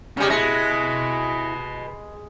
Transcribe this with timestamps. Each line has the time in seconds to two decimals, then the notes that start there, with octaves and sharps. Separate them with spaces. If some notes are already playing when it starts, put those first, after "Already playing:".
0.17 C#3 G3 C#4 D#4
0.30 G#3 E4 B4 D#5 A#6 C#7